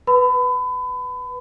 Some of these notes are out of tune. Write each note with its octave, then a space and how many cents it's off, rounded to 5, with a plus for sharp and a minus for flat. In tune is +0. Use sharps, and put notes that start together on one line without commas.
B4 +0 B5 +30